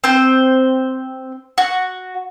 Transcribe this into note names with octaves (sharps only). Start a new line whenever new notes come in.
C4 C5
F#4